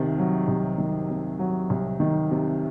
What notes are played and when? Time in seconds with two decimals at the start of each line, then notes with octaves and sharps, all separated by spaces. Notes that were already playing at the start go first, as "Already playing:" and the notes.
Already playing: C2 C3 D#3
0.18 F#3
0.48 C2
0.78 D#3
1.10 C3
1.39 F#3
1.70 C2
2.00 D#3
2.31 C3